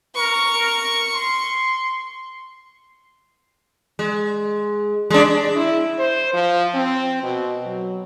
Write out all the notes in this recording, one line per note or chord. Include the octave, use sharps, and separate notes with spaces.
A#4 C#6
C6
G#3
G#3 D4
E4
C5
F3
C4
B2
F#3